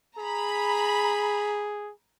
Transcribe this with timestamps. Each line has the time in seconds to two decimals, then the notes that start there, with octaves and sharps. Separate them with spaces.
0.19 G#4 A#5 B5